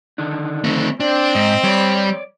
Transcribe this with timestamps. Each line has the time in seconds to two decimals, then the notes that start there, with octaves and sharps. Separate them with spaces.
0.18 D3 D#3 D4
0.64 A3 C4
1.00 C4 D4
1.35 G#2 D#5
1.64 G3 C#5 D5